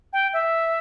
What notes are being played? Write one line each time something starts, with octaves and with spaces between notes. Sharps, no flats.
G5
E5